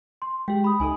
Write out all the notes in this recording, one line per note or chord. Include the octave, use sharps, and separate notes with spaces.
C6
G#3 G4 G5
B5 D#6
C#2 D#4 A4 G#5 D#6